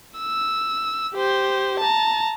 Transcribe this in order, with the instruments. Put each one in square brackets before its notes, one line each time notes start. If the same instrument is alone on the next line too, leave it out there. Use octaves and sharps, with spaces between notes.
[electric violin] E6
G4 C5
A5 A#5